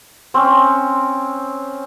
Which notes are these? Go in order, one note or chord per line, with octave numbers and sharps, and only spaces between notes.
C4 C#4